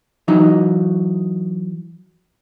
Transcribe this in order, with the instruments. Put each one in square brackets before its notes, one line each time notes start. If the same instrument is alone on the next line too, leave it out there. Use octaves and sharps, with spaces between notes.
[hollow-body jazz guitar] E3 F#3 D#4